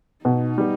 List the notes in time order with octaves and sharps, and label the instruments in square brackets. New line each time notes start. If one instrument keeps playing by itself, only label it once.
[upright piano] B2 [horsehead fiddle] D#4
[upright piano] G3 B3